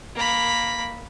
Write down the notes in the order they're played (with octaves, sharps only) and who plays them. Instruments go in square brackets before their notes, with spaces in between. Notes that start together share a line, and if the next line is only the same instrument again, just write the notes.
[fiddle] A#3 B5